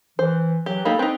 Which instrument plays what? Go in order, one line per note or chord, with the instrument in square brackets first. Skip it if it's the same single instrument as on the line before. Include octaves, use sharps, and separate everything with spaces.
[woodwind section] E3 [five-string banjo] C5
[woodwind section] E3 F#3 [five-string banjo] G4
[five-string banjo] A#3 D#4 G4 [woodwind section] A4 F5 B5
[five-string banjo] C4 D#4 [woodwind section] B4 G5